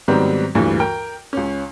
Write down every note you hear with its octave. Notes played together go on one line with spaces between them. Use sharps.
G#2 D#3 F#3 G3 B3 C4
D2 G2 A#2 E3 G3
A#4 G5
C#2 C#4